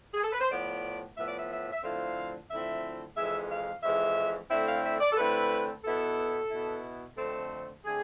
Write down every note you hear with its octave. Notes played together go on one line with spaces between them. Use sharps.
G#4
A4
B4
C5
A2 F3 B3 D5
A2 F3 B3 E5
D5
E5
E5
E5
D3 F3 A3 C4 E4 F5
D3 F3 A3 C4 E4 E5
F2 E3 G#3 E5
F5
F2 E3 G#3 E5
D3 A3 C4 E4 E5
F5
E5
D5
A4
D3 A3 C4 E4 B4
B2 B3 E4 A4
B2 B3 E4
F2 D3 A3 C4 A4
D3 A3 C4 G#4